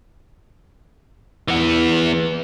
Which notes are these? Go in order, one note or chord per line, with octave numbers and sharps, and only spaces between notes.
E3 B3